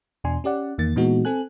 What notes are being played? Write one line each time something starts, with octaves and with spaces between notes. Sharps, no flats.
E2 B2 D4 G#5 C6
C#4 G4 D5 F#5
E2 D#3 A#3 A6
A#2 E3 G#3 B3 D#4 F#4
C4 A4 G#5 F#6